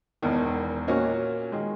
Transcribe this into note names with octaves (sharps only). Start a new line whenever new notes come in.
E1 E2 D#3
A#2 A#3 C#4 F#4
D#3 G#3